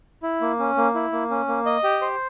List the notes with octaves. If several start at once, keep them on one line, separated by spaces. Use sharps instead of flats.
E4
A#3
C#4
A#3
E4
A#3
C#4
A#3
D#5
G4
C5